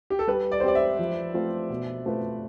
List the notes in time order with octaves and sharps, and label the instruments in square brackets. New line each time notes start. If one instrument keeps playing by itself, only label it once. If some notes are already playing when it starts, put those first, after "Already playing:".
[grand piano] G4
A4
[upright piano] G3 [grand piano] B4
[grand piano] D5
C5
[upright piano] C4 G4 [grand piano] D5
[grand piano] E5
[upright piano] F3
A3 C4 F4
B2
A3 C4 F4 B4